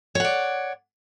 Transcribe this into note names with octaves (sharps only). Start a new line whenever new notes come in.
C#5 D5 F#5